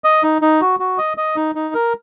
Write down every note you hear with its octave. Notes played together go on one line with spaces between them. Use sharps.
D#5
D#4
D#4
F#4
F#4
D#5
D#5
D#4
D#4
A#4